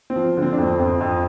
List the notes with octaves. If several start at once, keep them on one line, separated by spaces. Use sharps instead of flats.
C4
F3
D3
C4
D4
F2 C4
F2
F2